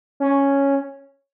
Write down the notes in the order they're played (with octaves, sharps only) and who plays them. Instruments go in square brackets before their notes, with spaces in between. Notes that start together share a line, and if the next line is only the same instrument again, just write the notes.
[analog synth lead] C#4